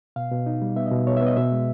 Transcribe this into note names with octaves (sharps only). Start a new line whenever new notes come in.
B2 F5
B2
D#4
G3
B3 E5
D#5
B2
B2 C#5
E5
B3 D#5
B2 E5
G#3